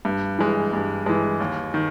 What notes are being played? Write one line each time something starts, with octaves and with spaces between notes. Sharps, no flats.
G2
E3 G#3
G2
E3 G#3
D#2
D#3